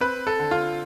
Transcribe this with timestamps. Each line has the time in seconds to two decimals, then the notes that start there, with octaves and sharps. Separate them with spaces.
0.01 C4 B4
0.27 A4
0.39 D3
0.51 F4